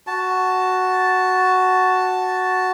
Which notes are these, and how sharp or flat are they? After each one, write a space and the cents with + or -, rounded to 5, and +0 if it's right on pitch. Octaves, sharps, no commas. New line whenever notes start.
F#4 +0 A5 +0